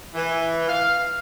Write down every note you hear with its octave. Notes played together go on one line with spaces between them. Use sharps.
E3
F5